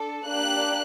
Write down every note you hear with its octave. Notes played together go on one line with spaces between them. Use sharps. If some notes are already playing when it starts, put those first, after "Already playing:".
Already playing: D4 A4
A#3 D4 G4 F#6